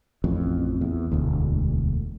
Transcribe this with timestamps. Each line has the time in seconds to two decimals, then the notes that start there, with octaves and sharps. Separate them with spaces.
0.24 A1 F2
0.81 E2
1.12 E1 D2